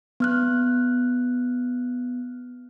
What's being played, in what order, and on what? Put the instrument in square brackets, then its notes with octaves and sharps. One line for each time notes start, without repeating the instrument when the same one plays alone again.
[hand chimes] B3 F6 F#6